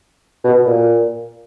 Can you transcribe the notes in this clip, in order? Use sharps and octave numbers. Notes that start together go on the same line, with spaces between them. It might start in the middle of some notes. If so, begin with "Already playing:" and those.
B2
A#2